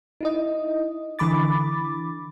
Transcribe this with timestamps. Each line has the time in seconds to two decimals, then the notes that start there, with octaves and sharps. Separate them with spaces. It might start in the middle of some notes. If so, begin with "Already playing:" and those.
0.21 D#4 E4 D#5
1.19 D3 E3 B5 D6 A6